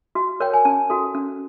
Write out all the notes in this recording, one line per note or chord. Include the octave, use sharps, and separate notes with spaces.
F#4
A#4 C#5 G5
G#5
C#4 A5
F#4 A4
C#4